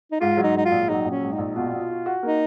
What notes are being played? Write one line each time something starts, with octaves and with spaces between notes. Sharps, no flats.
D#4
G#2 F4
F#3
D#4
G#2 D#4
F4
A#1
F#3 D#4
A#1
C#4
G#2
D#4
A#1
B2 F4
B2
F#4
F#4
A#3 D#4